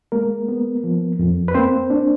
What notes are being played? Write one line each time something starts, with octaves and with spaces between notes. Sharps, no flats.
G#3 A#3 A#4
B3
F3
F2
B4
A#3 C4 C5
D4